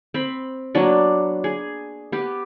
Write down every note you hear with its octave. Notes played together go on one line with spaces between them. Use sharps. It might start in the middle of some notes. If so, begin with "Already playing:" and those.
C4 B5
F#3 A#3 B3 D4
G#4
B3 G4